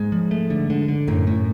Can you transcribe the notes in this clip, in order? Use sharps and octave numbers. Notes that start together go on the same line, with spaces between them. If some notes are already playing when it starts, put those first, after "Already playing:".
Already playing: G#2 G#3
F3
A3
D3
D3
D3
F#2 A2
A2